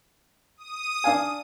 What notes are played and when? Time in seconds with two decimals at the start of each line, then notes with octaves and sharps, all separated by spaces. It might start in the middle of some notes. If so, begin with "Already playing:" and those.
0.57 D#6
1.04 D4 F5 G#5